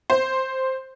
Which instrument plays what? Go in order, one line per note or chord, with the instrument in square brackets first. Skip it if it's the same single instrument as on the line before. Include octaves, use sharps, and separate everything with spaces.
[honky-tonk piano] C5